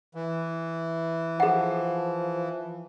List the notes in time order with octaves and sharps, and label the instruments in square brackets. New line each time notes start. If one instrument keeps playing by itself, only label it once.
[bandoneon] E3
[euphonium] F3 [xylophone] G#4 F#5